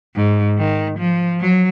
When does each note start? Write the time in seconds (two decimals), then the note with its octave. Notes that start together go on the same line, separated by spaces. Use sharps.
0.15 G#2
0.58 D#3
0.99 F3
1.40 F#3